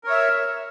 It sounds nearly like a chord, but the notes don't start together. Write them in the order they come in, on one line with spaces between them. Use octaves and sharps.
A#4 C#5 E5